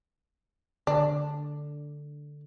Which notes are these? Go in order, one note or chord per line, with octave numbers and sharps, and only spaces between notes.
D3 D4